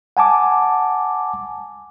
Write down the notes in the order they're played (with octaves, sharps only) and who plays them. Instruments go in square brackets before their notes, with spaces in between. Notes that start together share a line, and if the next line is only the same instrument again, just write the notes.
[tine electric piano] F#5 G#5 A5 D6